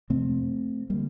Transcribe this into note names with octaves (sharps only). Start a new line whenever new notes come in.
F2 C3 A3 C4
D3 G3 A#3